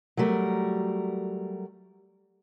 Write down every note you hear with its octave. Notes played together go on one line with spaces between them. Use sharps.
F#3 G3 A3 A#4